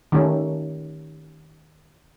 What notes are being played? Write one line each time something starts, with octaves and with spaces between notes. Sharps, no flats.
D#3 A3 C#4 G4